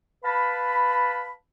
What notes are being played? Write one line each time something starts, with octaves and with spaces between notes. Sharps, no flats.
B4 F5 A5 B5